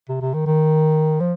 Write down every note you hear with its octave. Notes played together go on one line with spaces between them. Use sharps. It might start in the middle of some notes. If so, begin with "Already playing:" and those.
C3
C3
D#3
D#3
F3